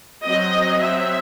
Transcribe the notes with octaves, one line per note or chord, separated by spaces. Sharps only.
F#3 C4 D#5
E5